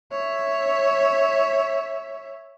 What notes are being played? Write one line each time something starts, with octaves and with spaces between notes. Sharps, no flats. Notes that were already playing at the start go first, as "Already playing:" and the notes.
C#5 E5